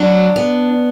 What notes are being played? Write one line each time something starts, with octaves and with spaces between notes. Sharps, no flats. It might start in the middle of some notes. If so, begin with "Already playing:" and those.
Already playing: F#3 D4
B3